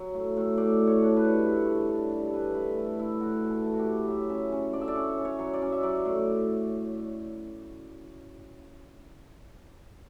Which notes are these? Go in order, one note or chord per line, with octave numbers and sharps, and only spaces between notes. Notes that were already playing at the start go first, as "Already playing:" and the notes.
Already playing: F#3
A2
A2
A2 D5
A2
C#5
D4
B4
G3
A2
D4
D4
G3
A4
E3 B4
A2 B4
A3 E4
A2 E4
A2 F#4
E3
A4
A3
F#4
G4
A2
F#3 E5
C#4 E5
C#4
D3 D5
E5
D5
C#4 C#5
C#4
C#5
F#3
D5
C#4
E5
F#3 D5
A2